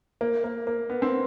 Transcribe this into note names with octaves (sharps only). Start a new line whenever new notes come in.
A#3
A#3
A#3
B3
C4